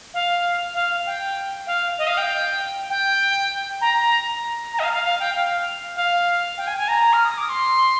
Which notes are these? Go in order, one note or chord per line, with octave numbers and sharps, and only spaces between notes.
F5
F5
G5
F5
D#5
F5
G5
G5
A#5
A#5
D#5
F5
F5
F5
G5
F5
F5
G5
G#5
G#5
A#5
F6
D#6
D6
C6